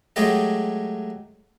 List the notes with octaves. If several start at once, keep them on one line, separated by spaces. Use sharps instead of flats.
F#3 G#3 A3 G4 A4 D#5